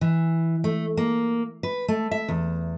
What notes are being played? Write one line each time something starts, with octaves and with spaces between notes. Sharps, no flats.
E3
A3
A#3
B4
A3
E5
E2